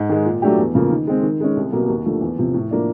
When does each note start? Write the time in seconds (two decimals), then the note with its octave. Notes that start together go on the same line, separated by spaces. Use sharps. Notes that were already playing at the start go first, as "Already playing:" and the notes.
Already playing: G#2
0.09 D#3 G#3
0.26 A#2
0.42 F#3 A3 D4 G4
0.58 E2
0.75 C#3 F3 A#3
0.91 D#3
1.07 G#3 C4
1.23 D#3
1.40 G#3 C#4
1.56 C2
1.72 B2 F#3 A#3
1.88 D#2
2.06 D3 F3 A3
2.21 E2
2.38 C3 F3
2.54 A2
2.71 F3 A#3 D4